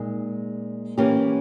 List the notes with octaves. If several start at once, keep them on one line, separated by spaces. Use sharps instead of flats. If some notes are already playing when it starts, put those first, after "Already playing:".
Already playing: A#2 G#3 D#4
E3 A#3 C#4 G4